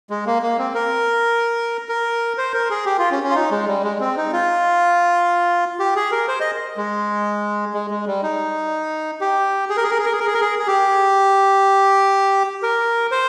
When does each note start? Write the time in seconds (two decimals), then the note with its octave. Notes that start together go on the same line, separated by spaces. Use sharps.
0.10 G#3
0.26 A#3
0.42 A#3
0.59 C4
0.75 A#4
1.89 A#4
2.38 C5
2.54 A#4
2.70 G#4
2.86 G4
2.99 F4
3.11 C#4
3.23 C#4
3.31 F4
3.35 D#4
3.51 G#3
3.68 G3
3.84 G#3
4.00 C4
4.17 D#4
4.33 F4
5.80 G4
5.96 G#4
6.12 A#4
6.28 C5
6.40 D#5
6.77 G#3
7.74 G#3
7.91 G#3
8.07 G3
8.23 D#4
9.21 G4
9.70 G#4
9.77 A#4
9.84 G#4
9.91 A#4
9.98 G#4
10.06 A#4
10.12 G#4
10.20 A#4
10.27 G#4
10.34 A#4
10.41 G#4
10.59 G#4
10.67 G4
12.63 A#4
13.11 C5